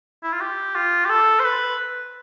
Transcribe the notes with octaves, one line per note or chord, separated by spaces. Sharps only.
E4
F4
G4
F4
G4
A4
C5
B4